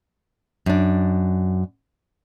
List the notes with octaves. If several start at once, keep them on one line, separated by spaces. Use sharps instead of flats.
F#2 D4